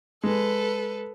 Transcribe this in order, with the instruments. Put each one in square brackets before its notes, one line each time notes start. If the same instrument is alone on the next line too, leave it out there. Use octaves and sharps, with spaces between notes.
[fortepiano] G#3 [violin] A4 B4